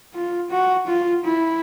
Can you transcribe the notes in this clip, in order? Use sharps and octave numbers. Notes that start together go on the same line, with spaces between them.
F4
F#4
F4
E4